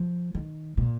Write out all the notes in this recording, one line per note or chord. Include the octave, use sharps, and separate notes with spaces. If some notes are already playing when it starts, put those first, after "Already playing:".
Already playing: F3
D#3
A#2